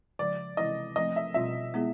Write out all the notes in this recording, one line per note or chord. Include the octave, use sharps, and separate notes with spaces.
C#3 F3 G#3 D5
C3 E3 G#3 C4 E4 D#5
F3 A3 C4 D#5
E5
B2 G3 C4 F4 E5
G#3 B3 E4 G#4